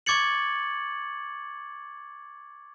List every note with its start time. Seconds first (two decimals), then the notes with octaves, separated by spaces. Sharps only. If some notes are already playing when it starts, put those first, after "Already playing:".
0.06 C#6 D6 G#6 A6 C#7 F#7